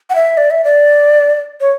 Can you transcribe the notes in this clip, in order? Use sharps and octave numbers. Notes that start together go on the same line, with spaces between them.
F#5
E5
D5
E5
D5
C#5